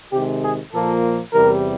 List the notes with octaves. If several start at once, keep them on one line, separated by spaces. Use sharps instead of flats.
C3 D#3 G#3 G4
G#4
A#2 F3 A#3 A4
E2 C3 E3 G3 A#4